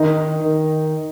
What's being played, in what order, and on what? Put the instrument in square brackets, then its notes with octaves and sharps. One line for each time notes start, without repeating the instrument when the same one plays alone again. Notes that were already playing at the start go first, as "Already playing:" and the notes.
Already playing: [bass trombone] D#3 [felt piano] D#4
[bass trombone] D#3